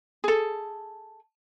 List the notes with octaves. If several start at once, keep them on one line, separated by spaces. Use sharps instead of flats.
G#4 A4